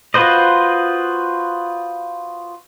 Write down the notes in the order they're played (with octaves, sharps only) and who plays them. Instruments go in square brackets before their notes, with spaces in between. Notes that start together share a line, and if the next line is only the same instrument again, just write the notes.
[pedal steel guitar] F4 F#4 B4 C5 D#5